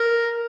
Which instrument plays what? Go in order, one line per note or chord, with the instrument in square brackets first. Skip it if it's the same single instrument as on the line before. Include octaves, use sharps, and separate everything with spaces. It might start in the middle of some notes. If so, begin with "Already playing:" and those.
Already playing: [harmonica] A#4